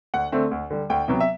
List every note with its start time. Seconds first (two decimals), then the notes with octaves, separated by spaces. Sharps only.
0.14 D2 F#5
0.32 D3 A3 C4
0.51 D2
0.70 D3 G3
0.90 D2 G5
1.08 C3 F#3 B3
1.20 E5